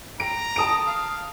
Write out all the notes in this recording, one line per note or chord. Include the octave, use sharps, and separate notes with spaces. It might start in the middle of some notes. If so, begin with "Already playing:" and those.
A#5 D7
A5 D#6 D7
F5